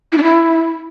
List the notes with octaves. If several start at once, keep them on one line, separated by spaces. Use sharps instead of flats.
E4
D4
E4